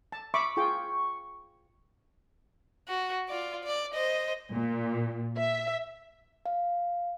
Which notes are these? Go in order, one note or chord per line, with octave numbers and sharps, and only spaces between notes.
A5
E5 B5 C#6 D6
F4 G#4 G5
F#4
F4 D5
D5
C5 D#5
A#2
E5
F5